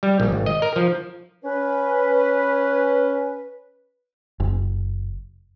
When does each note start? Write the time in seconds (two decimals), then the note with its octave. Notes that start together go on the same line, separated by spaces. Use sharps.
0.03 G3
0.20 A#1
0.32 G#1
0.46 D#5
0.62 A#4
0.76 F3
1.43 C#4 B4
4.40 F#1